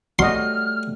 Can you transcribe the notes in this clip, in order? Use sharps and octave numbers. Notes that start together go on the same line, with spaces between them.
G3 A3 F#4 D#5 C6 F6